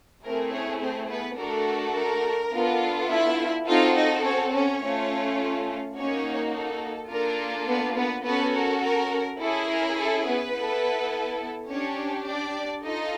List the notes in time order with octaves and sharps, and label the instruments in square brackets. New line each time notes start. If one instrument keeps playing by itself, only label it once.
[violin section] A3 C4 E4 G#4 A#4
C#4 C#5
C4 C5
B3 B4
A3 D4 F#4 A4 A#4
A#4
B3 D4 F4 A4
E4 E5
C4 D#4 F4 F#4 A4 F5
D#4 D#5
C#4 C#5
C#4 C#5
A3 C#4 F4
A#3 C#4 D#4 F#4 C#5
A4
A#3 D4 F4 A4 A#4
B3 B4
B3 B4
B3 C#4 F#4 A4 B4
A#4
A#4
C#4 E4 G#4 A4
A#4
A4
B3 B4
B3 E4 A4
C#4 D4 G4 C#5
D4 D5
D#4 F4 A4 D#5